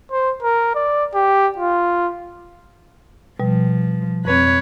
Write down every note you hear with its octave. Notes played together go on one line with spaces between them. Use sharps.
C5
A#4
D5
G4
F4
B2 F3 G3
F2 C4 B4 C#5